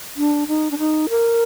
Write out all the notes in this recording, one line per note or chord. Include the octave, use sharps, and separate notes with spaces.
D4
D#4
D4
D#4
A#4